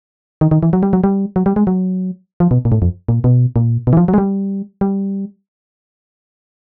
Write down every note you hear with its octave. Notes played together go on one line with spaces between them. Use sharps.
D#3
D#3
E3
F#3
G3
F#3
G3
F#3
G3
G#3
F#3
F3
B2
A#2
A2
F2
A#2
B2
A#2
B2
E3
F3
F#3
G#3
G3
G3